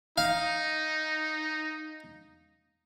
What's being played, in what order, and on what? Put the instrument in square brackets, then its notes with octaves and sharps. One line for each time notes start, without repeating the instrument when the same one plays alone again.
[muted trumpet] D#4 [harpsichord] F5